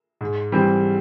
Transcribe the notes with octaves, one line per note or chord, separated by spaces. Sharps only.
G#2
E3 G3 C4